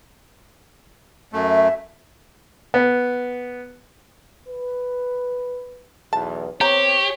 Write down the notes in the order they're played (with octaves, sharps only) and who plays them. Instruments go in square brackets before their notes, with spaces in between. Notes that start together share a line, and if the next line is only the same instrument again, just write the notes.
[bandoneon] F#2 A3 [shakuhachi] E5
[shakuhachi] E5
[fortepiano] B3
[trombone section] B4
[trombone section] B1 E2 [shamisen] A5
[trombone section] B3 C4 [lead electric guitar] G4 [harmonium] C#5 [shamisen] A#5